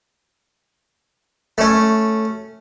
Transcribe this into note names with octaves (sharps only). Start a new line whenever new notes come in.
A3 C#4